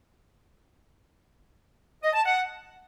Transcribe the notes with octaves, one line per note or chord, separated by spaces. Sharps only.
D#5
A5
F#5